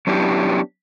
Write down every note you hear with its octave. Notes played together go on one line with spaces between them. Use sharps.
F#3 B3 C#4 D4 E4 G4